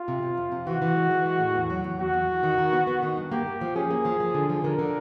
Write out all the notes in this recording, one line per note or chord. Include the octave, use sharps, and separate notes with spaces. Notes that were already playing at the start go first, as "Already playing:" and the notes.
Already playing: F4
C3
C3
F2
C3
E3 F#4
E3
G#3
E3
G#3
A2
E2
F#3
E2
E2 F#4
E2
E2
D#3
D#3
B3
B3
D#3
G2
A#3 G4
A#3
F3
C#4 G#4
A#3
F3
F3
D3
F3
D3 A#4
D3